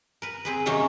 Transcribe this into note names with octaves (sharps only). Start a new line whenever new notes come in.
A#4 B4
C4 G#4 B4
C3 D#3 F#3 A#3 C#4